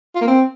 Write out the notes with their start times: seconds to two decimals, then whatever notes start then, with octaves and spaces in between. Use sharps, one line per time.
0.15 F4
0.21 A#3
0.27 C4